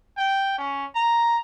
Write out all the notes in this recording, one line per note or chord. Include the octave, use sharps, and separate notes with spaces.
G5
C#4
A#5